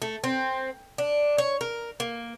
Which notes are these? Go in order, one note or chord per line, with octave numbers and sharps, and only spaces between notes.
A3
C4
D4
C#5
A#4
A#3